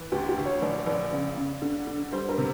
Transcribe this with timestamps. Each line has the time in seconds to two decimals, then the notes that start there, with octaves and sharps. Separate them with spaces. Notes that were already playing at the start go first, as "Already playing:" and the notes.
Already playing: E3
0.12 D2 G4
0.29 G4
0.37 D2
0.46 C#5
0.62 A#1 D5
0.86 A#1 D5
1.12 C#3
1.37 C#3
1.62 D3
1.87 D3
2.12 G3 C5
2.29 A#4
2.38 C3